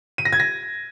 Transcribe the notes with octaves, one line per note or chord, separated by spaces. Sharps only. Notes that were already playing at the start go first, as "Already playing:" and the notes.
D#7
A#6
G#6
A#6